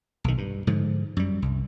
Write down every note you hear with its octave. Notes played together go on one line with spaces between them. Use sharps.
B1 D#3
G2
G#2 D3 F3
F#2 G3
C2